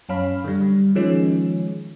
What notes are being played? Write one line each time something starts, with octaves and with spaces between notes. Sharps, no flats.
F#2 C#4 F5 B5
D3 G3
D#3 F3 G#3 C#4